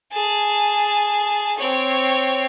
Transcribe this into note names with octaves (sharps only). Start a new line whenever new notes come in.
G#4 A5
C4 C#5